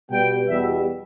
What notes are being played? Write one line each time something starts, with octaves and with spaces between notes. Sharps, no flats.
B2 G3 B3 G5
E2 B2 G3 E5